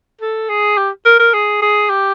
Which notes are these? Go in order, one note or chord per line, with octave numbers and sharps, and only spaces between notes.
A4
G#4
G4
A#4
A#4
G#4
G#4
G4